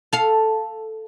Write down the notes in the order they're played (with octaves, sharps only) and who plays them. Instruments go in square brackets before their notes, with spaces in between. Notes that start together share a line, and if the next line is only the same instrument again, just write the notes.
[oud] A4 F5